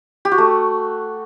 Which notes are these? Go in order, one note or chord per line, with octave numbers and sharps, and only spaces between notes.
G4
F#4
A3